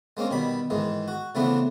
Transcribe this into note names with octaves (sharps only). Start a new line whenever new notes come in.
G#3 A#3 C4 C#4
B2 D#3 G3 B5
G#2 D#3 E3 G#3
F#4
C#3 E3 A3 B3 C4 D4